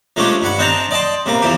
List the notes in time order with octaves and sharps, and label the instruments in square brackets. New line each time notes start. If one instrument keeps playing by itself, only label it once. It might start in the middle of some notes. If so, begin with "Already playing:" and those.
[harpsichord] F3 G#3 A3 C#4 D4 G4
G2 G3 F#5 B5
C4 D4 D#5 G5 A5 A#5
D5 D#5 G5 A5 C6
C3 G3 A#3 C4
E2 E3 F3 G4